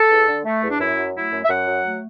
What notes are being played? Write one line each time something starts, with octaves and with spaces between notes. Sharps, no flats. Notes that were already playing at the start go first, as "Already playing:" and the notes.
Already playing: A4
E2
D3
A3
E2
D4
F#2 E4
F#3
A3 E4
F#2
E5
F#2 F#5
F#3
A3